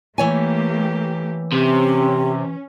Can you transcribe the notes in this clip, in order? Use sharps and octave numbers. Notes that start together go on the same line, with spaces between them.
E3 A3 A#3 G4 C#5 G#5
C3 C#4 G4